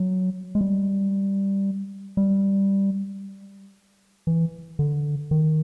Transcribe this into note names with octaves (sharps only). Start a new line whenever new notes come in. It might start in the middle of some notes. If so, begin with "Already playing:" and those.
Already playing: F#3
G#3
G3
G3
E3
D3
D#3